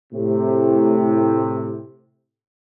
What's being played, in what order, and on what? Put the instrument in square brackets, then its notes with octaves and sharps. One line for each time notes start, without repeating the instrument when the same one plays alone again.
[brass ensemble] A2 C3